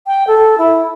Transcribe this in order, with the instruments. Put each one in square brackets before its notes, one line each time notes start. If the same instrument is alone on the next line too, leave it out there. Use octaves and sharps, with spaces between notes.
[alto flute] G5
A4
E4